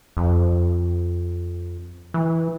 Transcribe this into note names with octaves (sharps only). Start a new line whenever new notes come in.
F2
E3